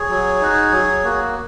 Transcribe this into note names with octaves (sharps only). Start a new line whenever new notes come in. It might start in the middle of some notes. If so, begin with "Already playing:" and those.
Already playing: G#4 C#5
F#3
D#4 F#4
F#3
A#3 F#4